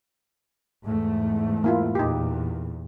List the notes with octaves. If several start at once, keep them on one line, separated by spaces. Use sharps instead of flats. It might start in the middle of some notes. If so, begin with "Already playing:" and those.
E2 G#2 A3
A#3 E4 F4
E2 A#2 D#4 G4